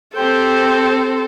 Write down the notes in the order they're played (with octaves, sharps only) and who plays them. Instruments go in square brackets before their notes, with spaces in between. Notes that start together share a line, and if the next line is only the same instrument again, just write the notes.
[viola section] C4 C5 [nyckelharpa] G4 G5 [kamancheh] A4